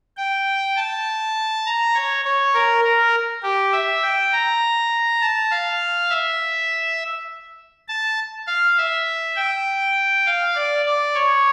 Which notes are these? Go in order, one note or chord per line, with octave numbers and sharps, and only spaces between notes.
G5
A5
A#5
C#5
C#5
A#4
A#4
G4
E5
G5
A#5
A5
F5
E5
A5
F5
E5
G5
F5
D5
D5
C#5